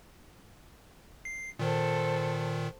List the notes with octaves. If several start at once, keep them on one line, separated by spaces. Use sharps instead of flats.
C7
A#2 D#3 A4 C5